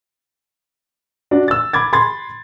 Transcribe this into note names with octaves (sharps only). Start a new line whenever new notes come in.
D4 F#4 D5
E6 A6
B5 D6 G#6 A6
B5 C6 G#6 A6